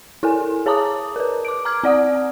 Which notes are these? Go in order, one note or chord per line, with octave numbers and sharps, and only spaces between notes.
E4 A4 A#4 G#5
G#4 C#5 A5 A#5 D6 D#6
A#4 B4
D6 D7
A#5 D6 F6 G#6
C4 D5 F#5 D#6